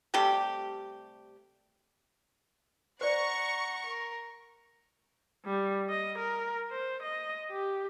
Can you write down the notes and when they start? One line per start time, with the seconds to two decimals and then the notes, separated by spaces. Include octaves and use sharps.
0.14 C3 G3 A3 G4
3.01 C5 D5 F#5 A#5 C#6
3.85 A#4
5.46 G3
5.90 D#5
6.19 A#4
6.71 C5
7.03 D#5
7.51 G4